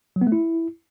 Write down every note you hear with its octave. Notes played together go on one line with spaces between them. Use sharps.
F#3
B3
A3
E4